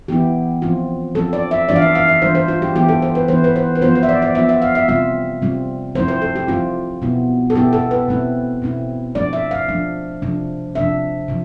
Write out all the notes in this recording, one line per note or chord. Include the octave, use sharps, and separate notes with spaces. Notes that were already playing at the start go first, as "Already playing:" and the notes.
E3 B3 E4 G4
F3 C4 F4
F3 C4 F4 A4
D5
E5
E3 G3 D4 F4 D5
F5
E5
F5
E5
E3 G3 D4 F4 C5
C5
F4
G4
E3 B3 E4 G4
A4
C5
B4
E3 B3 E4 C5
B4
C5
B4
F3 B3 F4 C5
C5
E5
D5
D5
F3 B3 F4 E5
E5
F5
E5
C3 G3 C4 F4 E5
C3 G3 C4 F4
F3 A3 C4 E4 C5
C5
A4
G4
F3 A3 C4 E4 F4
B2 B3 E4
A4
B2 B3 E4 G4
A4
B4
B2 A3 C4 E4
B2 A3 C4 E4
F3 A3 D4 D5
E5
F5
F3 A3 D4
C3 F3 A3 D4
C3 F3 A3 D4 E5
C3 F3